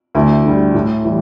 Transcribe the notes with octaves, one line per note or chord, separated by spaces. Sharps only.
D2 E4
D3 G3
A2
E3 G3